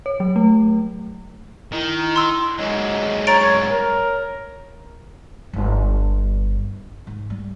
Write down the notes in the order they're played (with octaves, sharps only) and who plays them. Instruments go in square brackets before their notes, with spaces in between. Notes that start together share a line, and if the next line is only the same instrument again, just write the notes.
[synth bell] C#5
F#3
A3
[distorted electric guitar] D#3 [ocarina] E4
[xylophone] C6 E6
[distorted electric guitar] G#2 F#3 [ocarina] D#5
[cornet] C#5 [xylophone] A#5 A6 D7
[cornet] A#4 [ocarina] C#5
[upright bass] G1 G3
G#2
G3